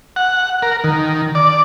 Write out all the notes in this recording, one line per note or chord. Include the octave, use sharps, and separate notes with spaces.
F#5
A#4
D#3
D5